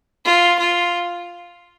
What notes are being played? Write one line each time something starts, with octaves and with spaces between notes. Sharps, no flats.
F4
F4